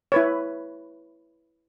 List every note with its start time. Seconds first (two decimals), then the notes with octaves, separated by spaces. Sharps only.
0.12 E4 B4 C#5